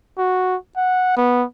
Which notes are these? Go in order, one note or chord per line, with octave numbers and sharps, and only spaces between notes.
F#4
F#5
B3